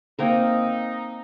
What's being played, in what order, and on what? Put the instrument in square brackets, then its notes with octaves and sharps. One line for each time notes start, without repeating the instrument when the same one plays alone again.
[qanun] A#3 C4 A#4 [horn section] D#4